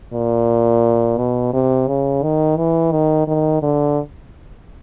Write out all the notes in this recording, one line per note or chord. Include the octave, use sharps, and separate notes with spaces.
A#2
B2
C3
C#3
D#3
E3
D#3
D#3
D3